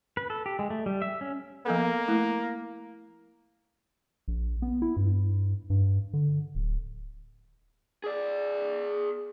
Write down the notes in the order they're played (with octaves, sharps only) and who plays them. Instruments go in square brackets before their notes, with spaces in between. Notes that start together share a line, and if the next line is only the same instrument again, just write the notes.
[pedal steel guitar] B4
A4
G4
G#3
A3
G3
E5
C#4
[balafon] F3 B3 A4 [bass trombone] A#3
[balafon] A3 E4
[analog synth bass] A#1
B3
E4
G2
G2
D3
D1
[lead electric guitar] G#4 D5